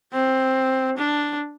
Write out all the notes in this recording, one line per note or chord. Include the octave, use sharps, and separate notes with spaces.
C4
D4